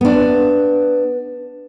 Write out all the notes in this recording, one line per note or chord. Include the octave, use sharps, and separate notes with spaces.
B3 D4